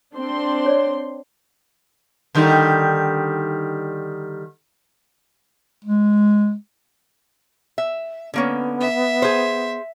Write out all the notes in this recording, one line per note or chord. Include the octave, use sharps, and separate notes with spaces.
C4 D4 C6
C#5 D5
D3 D#3 G3
G#3
E5
D3 A#3 B3 C#4
E5
G#4 C5